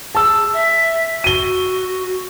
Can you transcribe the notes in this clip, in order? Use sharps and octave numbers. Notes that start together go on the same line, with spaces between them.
G#4 A5 E6
E5
F#4 D#7 G7